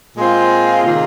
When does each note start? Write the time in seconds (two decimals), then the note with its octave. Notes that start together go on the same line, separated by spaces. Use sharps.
0.16 A#2 G#3 C4 F4
0.84 C3 D#3 A#3 F4 G#4